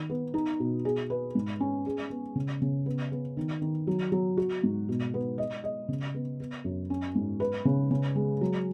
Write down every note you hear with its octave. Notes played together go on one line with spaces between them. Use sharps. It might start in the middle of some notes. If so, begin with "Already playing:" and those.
Already playing: D#3 D#4
B3
D#4
B2
G#4
B4
G#2
C#4
G#4
B3
C#3
C#3
B3
B3
D#3
D#3
F#3
F#3
F#4
G#2
B2
B3
D#5
D#5
C#3
B3
B3
F#2
C#4
G#2
B4
C#3
C#3
G#3
F#3